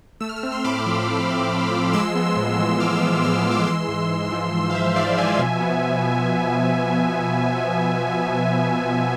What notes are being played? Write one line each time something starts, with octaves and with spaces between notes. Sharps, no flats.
A3 E6
F6
E6
C4 F6
C6 E6
A2 B5 D6
F3
A3
C4
A2
F3
G#3 C6 E6
B3
A2
E3
G#3 D6 F6
B3
A2 F6
E3
D6 F6
G#3 C6 E6
G#2
G#2
F3
G#3
F5
G#2 C5 E5
G#2 D5 F5
F3 E5 G#5
B2
B3